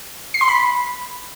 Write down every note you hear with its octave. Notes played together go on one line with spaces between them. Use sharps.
C7
C6
B5